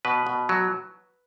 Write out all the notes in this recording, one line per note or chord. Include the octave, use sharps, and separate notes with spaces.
B2 B4
B2
F#3